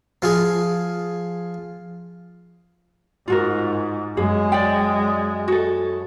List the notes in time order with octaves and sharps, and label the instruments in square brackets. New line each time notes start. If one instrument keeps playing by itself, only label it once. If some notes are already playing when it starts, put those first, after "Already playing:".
[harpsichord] F3 F4 G#4
[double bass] G#2 [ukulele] F4 F#4 A#4
[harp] F#2 [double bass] G#3 [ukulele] G#4
[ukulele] D5 G5
[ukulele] F#4 A4 [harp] G#4 C#6